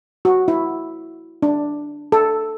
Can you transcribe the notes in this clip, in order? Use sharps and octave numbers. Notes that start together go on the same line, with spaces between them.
F#4
E4
D4
A4